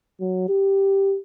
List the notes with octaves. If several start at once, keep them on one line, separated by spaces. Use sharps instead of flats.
F#3
G4